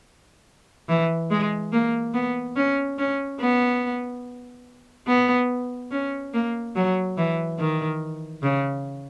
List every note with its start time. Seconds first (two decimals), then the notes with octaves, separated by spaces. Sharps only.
0.88 E3
1.31 G#3
1.72 A#3
2.14 B3
2.56 C#4
2.98 C#4
3.40 B3
5.07 B3
5.91 C#4
6.33 A#3
6.76 F#3
7.17 E3
7.59 D#3
8.42 C#3